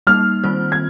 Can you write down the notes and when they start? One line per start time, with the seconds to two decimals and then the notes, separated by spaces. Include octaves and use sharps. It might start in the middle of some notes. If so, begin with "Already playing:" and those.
0.07 G3 A#3 D#4 F6
0.44 D#3 G3 C4 F4 C5
0.72 G#6